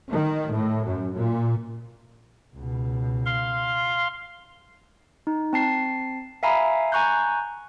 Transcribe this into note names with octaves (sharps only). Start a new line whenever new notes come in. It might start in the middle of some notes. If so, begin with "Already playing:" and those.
D#3
A2
F#2
A#2
C#2 B2
F5 C6
D#4
C4 A5 C7
E5 F5 G#5 A#5 B5
G#5 A#5 C#6 F#6 G6